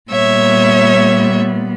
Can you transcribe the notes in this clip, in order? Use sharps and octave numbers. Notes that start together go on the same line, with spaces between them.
A#2 G3 B3 C#5 E5